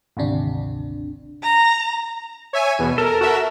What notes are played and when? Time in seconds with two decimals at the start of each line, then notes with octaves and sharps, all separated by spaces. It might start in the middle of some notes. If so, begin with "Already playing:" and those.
0.17 G#1 D2 C3 D4
1.43 A#5
2.53 C#5 E5 G#5
2.79 E2 B2
2.98 A4 A#4
3.21 F#4 A#4 E5